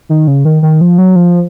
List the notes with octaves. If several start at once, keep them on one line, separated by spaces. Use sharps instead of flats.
D#3
C#3
D#3
D#3
F3
F#3
F3